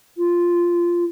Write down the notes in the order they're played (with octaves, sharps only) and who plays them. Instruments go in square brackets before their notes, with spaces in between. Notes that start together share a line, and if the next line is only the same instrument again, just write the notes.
[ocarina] F4